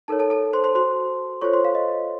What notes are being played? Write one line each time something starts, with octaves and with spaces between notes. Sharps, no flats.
D#4 A4 A#4 C#5 A5
A4 A5
A4 A5
C5 C6
C5 C6
F#4 C5 C6
F4 A4 C5 C#5 C#6
C5 C6
F5
D#5